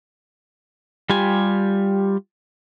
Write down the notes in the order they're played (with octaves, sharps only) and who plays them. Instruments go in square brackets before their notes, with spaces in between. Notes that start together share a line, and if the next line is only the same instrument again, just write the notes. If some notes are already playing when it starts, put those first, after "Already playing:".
[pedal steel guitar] G3 F4 G4 G#5